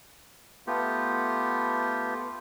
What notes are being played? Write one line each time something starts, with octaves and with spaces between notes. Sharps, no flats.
A3 B3 F4 G4